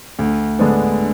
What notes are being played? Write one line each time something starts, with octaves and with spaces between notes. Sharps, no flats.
D2
D3 G#3 B3 D4